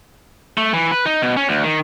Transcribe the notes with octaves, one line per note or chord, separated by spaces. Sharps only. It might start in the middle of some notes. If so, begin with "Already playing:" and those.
A3
E3
B4
D#4
B2
C#4
D2
D#3